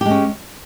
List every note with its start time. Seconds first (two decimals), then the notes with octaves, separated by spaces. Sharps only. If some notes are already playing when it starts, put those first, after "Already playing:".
0.01 G4
0.06 G#3
0.10 C#4